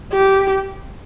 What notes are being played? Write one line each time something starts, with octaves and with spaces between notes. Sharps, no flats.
G4